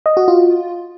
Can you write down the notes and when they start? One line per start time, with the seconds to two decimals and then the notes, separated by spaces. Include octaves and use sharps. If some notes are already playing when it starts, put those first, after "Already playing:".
0.06 D#5
0.17 F#4
0.28 F4